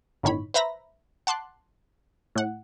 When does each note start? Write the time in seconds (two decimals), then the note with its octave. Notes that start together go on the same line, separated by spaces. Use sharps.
0.23 G1 A2 D#3 C#5 B5
0.54 B4 C5 E5 A#5 B5 A#6
1.27 F#5 A5 C6 D6 F#6
2.36 A2 F#5